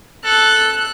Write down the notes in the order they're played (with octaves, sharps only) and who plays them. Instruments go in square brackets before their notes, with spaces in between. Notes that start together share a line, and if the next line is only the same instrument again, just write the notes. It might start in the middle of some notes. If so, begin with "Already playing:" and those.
[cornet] A4 [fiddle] F#6